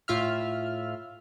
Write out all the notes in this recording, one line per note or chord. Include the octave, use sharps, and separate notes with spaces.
A2 F4 E5 F6